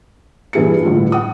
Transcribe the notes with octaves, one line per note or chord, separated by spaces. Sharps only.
G2 A#2 E3 G#4 E5 C#7
G1 A2 F4
F#5 D#6